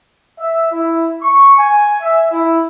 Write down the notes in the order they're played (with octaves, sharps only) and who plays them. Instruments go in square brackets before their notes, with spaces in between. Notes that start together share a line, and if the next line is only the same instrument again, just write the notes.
[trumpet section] E5
E4
C#6
G#5
E5
E4